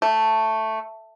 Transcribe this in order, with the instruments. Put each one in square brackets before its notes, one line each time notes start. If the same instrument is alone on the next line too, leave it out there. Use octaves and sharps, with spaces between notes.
[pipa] A3